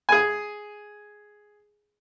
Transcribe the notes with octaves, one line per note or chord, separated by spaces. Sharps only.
G#4 G#5